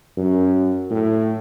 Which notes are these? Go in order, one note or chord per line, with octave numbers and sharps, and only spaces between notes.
F#2
A2